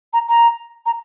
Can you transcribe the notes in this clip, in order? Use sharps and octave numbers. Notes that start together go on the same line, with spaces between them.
A#5
A#5
A#5